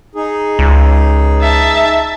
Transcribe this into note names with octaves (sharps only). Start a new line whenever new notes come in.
D#4 G#4
C#2
E5 A5